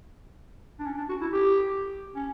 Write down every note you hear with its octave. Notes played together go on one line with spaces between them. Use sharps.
D4
C#4
D4
F#4
E4
G4
C#4